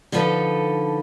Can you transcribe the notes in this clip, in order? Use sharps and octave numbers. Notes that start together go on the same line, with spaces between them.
D3 F3 D#4 A4 B4